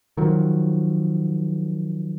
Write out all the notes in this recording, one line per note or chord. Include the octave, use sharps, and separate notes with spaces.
D#3 F3 F#3